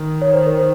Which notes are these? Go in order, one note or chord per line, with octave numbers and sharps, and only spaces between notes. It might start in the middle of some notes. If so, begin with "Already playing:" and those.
Already playing: D#3
C#5
C5
A#4
C5